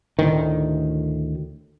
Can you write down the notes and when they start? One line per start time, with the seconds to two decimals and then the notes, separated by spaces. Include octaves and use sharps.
0.19 D2 A2 D#3